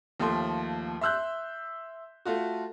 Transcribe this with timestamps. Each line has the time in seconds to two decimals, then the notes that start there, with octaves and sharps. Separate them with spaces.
0.20 D#2 F3 A3 C6
1.01 E5 C6 E6 F#6 G6
2.25 A3 F4 F#4